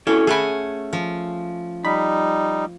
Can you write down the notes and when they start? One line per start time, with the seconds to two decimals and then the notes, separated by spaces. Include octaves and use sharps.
0.07 C#4 E4 F#4 A4
0.27 A3 G#4 F#5 G#5 B5
0.93 F3
1.85 G3 D#4 B5